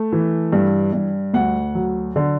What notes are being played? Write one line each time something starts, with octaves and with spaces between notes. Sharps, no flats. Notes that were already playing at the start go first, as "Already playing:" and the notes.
Already playing: A3
E3
G2
G2
D2 F#5
F#3
D3